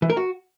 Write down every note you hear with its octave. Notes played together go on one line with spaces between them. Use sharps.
E3
A#4
F#4